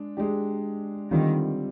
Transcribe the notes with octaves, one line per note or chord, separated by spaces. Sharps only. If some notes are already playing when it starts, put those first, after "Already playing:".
Already playing: G#3 D4
G#3 D4 G4
D3 D#3 G3 C4 F4